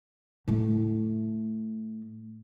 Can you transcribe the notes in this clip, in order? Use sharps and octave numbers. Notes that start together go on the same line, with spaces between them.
A2 A3